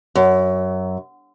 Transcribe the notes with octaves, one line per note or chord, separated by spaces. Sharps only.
F#2